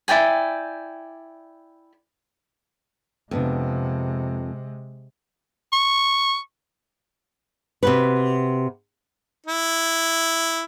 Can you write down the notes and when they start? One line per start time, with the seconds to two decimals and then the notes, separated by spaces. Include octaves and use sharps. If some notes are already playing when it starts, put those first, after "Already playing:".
0.08 E4 D5 G5 G#5
3.31 F2 C3 G#3 B3 D4
5.73 C#6
7.83 C3 F#4 B4
9.46 E4